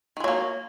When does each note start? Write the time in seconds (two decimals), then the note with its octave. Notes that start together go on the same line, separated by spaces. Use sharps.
0.17 D#3
0.20 G#3
0.24 F#3
0.28 A#3